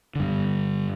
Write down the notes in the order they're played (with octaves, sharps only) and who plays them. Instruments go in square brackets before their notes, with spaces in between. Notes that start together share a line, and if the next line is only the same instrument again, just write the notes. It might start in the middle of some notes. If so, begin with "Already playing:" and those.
[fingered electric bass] G2 D3